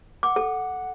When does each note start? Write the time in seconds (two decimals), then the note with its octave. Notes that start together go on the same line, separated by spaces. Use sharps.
0.23 F#5 D6
0.36 A4